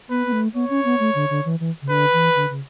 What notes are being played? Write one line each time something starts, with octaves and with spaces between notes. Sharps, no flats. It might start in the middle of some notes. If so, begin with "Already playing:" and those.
B3 B4
B3
A3
B3 C#5
C#4
B3
A3
D3
D3
E3
E3
C#3
D3 B4
E3
D3
C#3